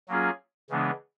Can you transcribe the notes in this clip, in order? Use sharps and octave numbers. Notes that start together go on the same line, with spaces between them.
F#3 A#3 C#4 F4 G#4
C#3 E3 G#3 B3 D4